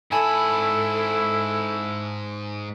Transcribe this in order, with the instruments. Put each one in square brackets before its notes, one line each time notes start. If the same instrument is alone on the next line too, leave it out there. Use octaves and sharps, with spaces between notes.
[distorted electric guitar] G#2 B5 [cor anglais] E4 [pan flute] A4 [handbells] G#5 A5